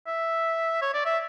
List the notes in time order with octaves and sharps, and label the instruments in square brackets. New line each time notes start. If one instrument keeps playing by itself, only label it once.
[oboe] E5
C#5
D5
E5